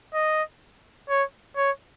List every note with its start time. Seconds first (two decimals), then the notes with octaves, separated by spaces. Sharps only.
0.14 D#5
1.09 C#5
1.57 C#5